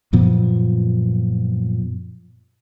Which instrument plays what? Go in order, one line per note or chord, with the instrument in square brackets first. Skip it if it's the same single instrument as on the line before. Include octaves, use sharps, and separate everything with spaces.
[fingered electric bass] F#2 A#2 F3 B3